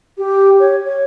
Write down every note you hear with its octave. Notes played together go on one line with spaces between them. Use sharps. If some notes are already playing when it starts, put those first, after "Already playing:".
G4
C#5
C#5